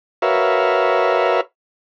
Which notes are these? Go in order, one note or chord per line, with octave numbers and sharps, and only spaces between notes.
F#4 A#4 B4 C#5 E5 F5